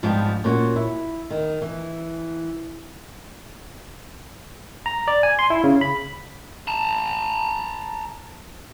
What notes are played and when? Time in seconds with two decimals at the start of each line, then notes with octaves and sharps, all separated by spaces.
0.03 G#2 F3 G3 B3 D4 G4
0.44 A#2 C#4 F#4
0.76 E4
1.30 D#3
1.62 E3
4.86 A#5
5.08 D5
5.23 G#5
5.39 C6
5.50 E4
5.64 C#3
5.81 B5
6.68 A5 A#5